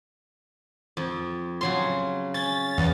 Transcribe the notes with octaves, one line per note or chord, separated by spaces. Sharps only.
F2
C#3 F#3 C6
C#4 A6
E2